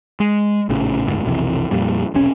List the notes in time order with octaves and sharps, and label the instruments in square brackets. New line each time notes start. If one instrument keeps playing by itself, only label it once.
[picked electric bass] G#3
A#1 A2 C#3
F#1 D2 G#2
B1 F2 C3 E3
F2 A#2 G3
E1 B1 C3 C#4